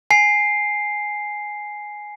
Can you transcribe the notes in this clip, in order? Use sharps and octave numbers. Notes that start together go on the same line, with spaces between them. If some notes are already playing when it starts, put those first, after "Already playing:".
G#5 C7